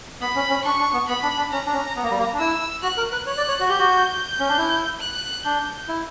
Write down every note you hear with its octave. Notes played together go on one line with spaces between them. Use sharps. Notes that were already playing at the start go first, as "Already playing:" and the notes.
B3 B5
C#4
C#4
D4 C#6
D4
B3
B3 B5
D4
D4
C#4 A#5
D4
C#4
B3
A#3
G3
A#3
D4
E4 E6
F#4 F#6
A#4
B4
C#5 F#6
D5
C#5
F#4
G4 G6
F#4
C#4
D4
E4
F#6
D4 G6
E4